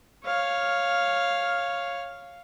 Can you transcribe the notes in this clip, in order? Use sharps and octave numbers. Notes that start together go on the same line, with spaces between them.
C#5 F5